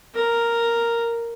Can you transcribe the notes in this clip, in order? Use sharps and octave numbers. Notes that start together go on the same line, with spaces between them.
A#4